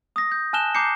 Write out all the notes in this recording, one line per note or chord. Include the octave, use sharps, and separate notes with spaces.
D#6 A#6
G6
G#5 A5 F6 F#6 E7 G7
A#5 D6 G6 C7 C#7